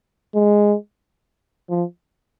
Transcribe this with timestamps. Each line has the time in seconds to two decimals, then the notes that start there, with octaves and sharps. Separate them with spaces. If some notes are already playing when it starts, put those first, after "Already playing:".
0.35 G#3
1.70 F3